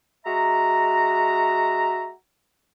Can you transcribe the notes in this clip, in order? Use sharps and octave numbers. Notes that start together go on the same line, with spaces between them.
G#3 F#4 E5 A#5